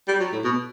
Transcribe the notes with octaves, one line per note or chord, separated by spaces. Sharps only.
G3
F#3
A2
B2